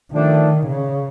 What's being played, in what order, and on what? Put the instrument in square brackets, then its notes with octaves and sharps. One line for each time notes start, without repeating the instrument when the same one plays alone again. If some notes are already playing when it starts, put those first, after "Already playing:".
[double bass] D#3 [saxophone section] F3 A3 D4
[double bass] C#3